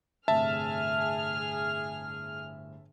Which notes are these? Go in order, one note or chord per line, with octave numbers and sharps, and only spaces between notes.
G1 A2 C3 G#4 E5 A5 F6